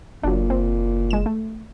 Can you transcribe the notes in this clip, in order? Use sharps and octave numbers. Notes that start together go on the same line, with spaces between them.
F#1 A#2 F#3 D4
C4
G#3 E7
A3